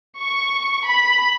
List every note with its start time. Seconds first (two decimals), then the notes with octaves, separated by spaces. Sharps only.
0.19 C#6
0.86 B5